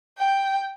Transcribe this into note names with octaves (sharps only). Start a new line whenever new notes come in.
G5